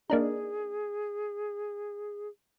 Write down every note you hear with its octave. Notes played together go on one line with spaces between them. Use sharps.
A#3 D4 D#4 G#4